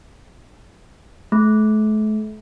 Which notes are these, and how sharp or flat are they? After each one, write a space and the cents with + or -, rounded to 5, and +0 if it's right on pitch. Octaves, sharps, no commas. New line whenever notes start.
A3 -40